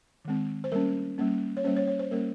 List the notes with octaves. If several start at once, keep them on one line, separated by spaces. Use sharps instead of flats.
D#3 G#3 C4
C5
G3 A#3 C#4 A#4
G3 A#3 C#4
C#5
G3 A#3 C#4 C5
C#5
C#5
C5
G3 A#3 C#4 A#4